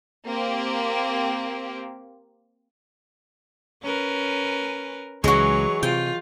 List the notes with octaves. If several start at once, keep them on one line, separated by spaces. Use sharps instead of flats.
A#3 C4 G4
C#4 A#4 B4
C#2 E3 F#3 G#3 F#4 C#5
C3 F4 G5